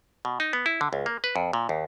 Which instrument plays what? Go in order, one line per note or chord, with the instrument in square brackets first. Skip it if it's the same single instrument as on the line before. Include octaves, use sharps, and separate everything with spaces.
[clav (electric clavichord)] B2
D#4
B3
E4
D3
C#2
A#3
B4
F2
A#2
D#2